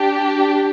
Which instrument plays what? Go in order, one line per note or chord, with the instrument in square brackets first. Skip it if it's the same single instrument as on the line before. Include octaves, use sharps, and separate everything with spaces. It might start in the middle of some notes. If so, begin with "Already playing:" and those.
Already playing: [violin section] D4 G4